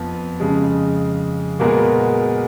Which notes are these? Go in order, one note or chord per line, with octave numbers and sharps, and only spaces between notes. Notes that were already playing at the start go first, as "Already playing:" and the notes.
Already playing: F2 F3 B3
F2 C#3 G#3
A#2 G#3 B3 F#4 A#4